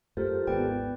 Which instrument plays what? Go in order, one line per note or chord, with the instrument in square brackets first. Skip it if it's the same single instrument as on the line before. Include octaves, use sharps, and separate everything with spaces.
[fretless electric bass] F#2 A3 [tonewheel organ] F4 G4 A4 [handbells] A#4 C5
[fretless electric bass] G#1 D#2 G#2 [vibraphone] B3 [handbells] B4 D5 G5